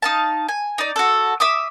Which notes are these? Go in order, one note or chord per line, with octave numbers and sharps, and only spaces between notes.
D#4 F5 A5
G#5
D#4 D5
F#4 A4
E5 D6 D#6